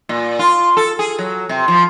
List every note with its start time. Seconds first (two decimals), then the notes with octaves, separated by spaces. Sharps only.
0.09 A#2
0.39 F4
0.77 A4
0.99 G#4
1.19 F#3
1.49 C3
1.68 F3